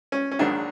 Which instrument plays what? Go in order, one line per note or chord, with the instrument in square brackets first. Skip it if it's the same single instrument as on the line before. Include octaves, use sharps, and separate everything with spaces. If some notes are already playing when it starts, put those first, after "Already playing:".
[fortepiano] C#4
C#4
A#1 G#2 D#3 F#3 D4